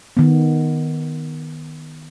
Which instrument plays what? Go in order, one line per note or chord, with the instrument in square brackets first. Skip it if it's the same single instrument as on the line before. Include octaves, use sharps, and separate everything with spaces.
[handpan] D#3 B3